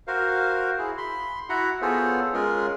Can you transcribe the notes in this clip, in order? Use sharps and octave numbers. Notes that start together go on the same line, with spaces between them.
F#4 A#4 C5 F5
E4 G#4
B5 C6
E4 F#4 F#5 A#5 B5
B3 F4 G#4 A4 C5 C#5
G#3 C#4 F4 G#4 A#4